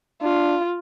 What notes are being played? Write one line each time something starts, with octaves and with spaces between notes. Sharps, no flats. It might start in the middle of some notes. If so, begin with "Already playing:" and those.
D4 F4